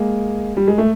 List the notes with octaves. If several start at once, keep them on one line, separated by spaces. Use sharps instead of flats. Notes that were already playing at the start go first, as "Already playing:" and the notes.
Already playing: G#3 A#3
G3
G#3
A3